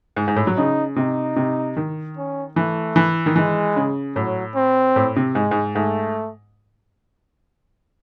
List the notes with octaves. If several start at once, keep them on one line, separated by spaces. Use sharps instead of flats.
G#2
G#2
A2
F#3
C#3 D#4
C3 D#4
C3
D#3
C#4
E3 A3
E3
D#3
E3 G#3
C#3
A2 F#3
C4
A2
C3
G#2 G#3
G#2
G#2 A3